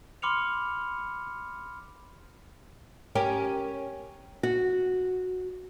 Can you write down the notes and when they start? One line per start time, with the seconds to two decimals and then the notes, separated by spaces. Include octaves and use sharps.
0.22 B5 C6 D6 F6 C#7 F7
3.15 C#4 G4 A#4
4.43 F#4